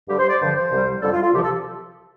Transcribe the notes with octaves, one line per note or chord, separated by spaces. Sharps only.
G2 D3 G3 G4
C5
D5
G2 D3 F3 C5
C5
C2 C3 G3
F2 D3 G3 A4
F4
F4
C2 C3 F3 G4
A4